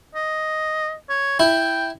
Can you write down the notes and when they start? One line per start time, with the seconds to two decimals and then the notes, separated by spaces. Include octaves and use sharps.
0.15 D#5
1.09 C#5
1.40 E4 G5